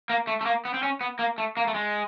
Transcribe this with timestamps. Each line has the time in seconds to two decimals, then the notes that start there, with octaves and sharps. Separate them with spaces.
0.10 A#3
0.27 A3
0.41 A3
0.46 A#3
0.65 B3
0.74 C4
0.83 C#4
1.01 B3
1.19 A#3
1.38 A3
1.57 A#3
1.67 A3
1.74 G#3